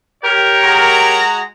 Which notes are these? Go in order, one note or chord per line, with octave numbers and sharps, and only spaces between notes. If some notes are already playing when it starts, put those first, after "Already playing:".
G4 A#4 C#5
G#3 F#4 A#5